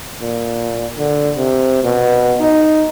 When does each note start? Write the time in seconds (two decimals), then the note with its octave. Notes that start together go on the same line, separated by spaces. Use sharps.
0.21 A#2
0.98 D3
1.36 C3
1.84 B2
2.40 D#4